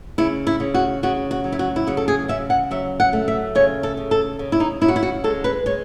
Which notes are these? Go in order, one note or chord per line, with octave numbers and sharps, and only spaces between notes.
C#3 E4
E4
C#3
F#4
C#3 F#4
F#4
F#3
E4
F#4
E4
C#3 F#4
A4
G#4
C#3 E5
F#5
F#3 E5
F#5
A3
E5
C#3 C#5
A4
C#3
A4
C#3
E4
D#4
C#3 E4
F#4
E4
F#4
G#3 A4
B4
G#3 C#5